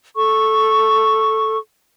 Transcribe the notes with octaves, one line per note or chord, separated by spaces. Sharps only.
A4 C#6